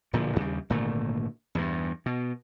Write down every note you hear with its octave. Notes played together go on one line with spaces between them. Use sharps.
D1 A#2 D3 F3
D#2 C#3 G3
G#1 A#2 D3 A3
E2 G2
B2